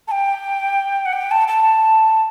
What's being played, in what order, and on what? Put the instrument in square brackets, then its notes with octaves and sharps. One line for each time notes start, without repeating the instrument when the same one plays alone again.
[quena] A5
G5
F#5
G5
A5
A5